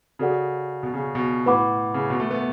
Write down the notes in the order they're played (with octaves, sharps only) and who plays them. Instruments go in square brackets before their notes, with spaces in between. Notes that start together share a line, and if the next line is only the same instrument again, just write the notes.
[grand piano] C#3 [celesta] F#4 A4 D5 F#5
[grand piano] B2
C#3
B2
[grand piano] A2 [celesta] B4 F#5 B5 D6
[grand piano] C#3
B2
A3
B3